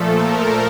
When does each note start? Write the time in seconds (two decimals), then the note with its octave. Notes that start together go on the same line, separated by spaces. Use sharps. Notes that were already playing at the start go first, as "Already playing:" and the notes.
Already playing: A#2 F3 A3 A4
0.16 A#4